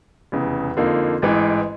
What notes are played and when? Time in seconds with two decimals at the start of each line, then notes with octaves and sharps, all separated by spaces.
0.32 F1 E2 C#3
0.77 F2 D3 F3 A#3 D#4
1.22 A1 G#2 E3